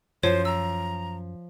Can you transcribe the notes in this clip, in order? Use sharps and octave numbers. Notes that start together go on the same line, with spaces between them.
F#2 F3 C5 C#5
A#5 E6